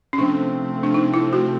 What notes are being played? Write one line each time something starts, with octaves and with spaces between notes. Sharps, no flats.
C#4
C3 F3 A3 C4 D4
D4
D#4
E4
F#4